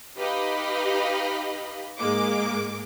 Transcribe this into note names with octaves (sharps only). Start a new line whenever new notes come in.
D#4 G4 B4 D#5 F5 B5
G#2 G#3 A#3 D6